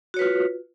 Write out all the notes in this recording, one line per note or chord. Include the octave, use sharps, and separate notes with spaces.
F4 F#4 B4 C#5